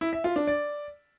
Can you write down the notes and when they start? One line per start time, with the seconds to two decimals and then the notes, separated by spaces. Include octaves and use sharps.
0.01 E4
0.13 E5
0.24 F4
0.36 D4
0.47 D5